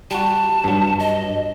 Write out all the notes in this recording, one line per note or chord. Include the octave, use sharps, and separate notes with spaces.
G3 F#4 A5
G2 F#3
D#5